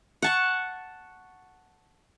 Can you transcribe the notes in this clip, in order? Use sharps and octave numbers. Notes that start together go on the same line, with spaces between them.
F#5 A5 C#6